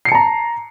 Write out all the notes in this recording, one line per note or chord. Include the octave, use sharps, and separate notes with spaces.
A5 A#5 C7 C#7